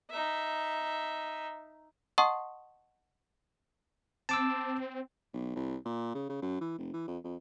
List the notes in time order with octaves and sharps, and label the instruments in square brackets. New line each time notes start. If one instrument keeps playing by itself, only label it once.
[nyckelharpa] D#4 E5
[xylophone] D#5 F#5 A5 C6 C#6 D#6
[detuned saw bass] C4 [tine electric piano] A5 D6 E6
[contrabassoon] B1
C2
A#2
C#3
C#3
F#2
E3
F1
E3
F2
F2